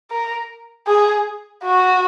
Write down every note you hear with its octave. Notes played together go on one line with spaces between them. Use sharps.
A#4
G#4
F#4